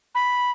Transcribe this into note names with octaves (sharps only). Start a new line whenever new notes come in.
B5